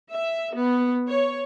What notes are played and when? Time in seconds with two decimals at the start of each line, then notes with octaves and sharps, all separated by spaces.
0.10 E5
0.55 B3
1.08 C#5